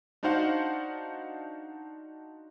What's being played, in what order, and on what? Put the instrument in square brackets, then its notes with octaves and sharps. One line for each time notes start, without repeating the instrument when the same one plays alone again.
[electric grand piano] D4 D#4 F#4 C5 F5 F#5